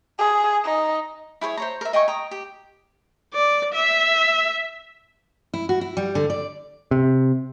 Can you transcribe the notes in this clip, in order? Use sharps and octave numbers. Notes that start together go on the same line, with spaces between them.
G#4
D#4
E4 G#4 C5 C#5
C5 C#5 A#5
A#4 E5
D#5 G5 G#5 C#6
G5 A#5 D#6
G4
D5
E5
E4
F#4
E4
G3
D3
D5
C3